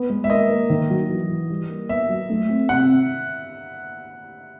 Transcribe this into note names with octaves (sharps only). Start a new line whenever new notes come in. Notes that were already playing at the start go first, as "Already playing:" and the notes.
Already playing: B3
G#3
E5
A#3 D#5
A#3
D#3
F#3
E3
E3
G3
A#3
B3 E5
F#3
A3
C4
C3 F#5